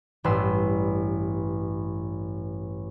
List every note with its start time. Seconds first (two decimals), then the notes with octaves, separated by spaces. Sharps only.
0.24 A1 G2 B4 C6 E6